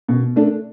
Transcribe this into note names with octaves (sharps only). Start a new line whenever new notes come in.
B2
A3 D4